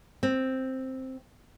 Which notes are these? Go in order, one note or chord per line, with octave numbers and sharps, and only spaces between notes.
C4